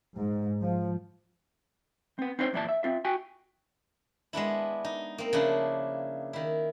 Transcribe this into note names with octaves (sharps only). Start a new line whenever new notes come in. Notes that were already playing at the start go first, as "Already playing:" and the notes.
G#2
F3
B3 C4
C4 D4 D#4 C5 C#5
F#2 A#2 E3 E4 D5 A5
E5
C4 F4 E5
F#4 G5 G#5
G#3 B3 D4 E4
D#4
A#3 C4
C#3 F3 D4 E4
D#3 E4